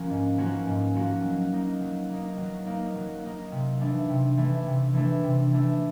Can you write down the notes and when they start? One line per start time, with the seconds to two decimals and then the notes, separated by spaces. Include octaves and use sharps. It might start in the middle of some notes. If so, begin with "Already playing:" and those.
Already playing: F3 A#3 C#4 F#4
0.10 G#2
0.38 F3 A#3 C#4 F#4
0.67 G#2
0.95 F3 A#3 C#4 F#4
1.24 F#3
1.52 A#3 D#4
1.81 F#3
2.10 A#3 D#4
2.38 F#3
2.66 A#3 D#4
2.96 F#3
3.23 A#3 D#4
3.52 C3
3.81 E3 A3 D4
4.10 C3
4.37 E3 A3 D4
4.67 C3
4.94 E3 A3 D4
5.24 C3
5.53 E3 A3 D4